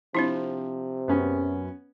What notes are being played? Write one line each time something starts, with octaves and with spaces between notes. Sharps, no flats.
C3 F3 C4 D4 E4
F#2 B3 C#4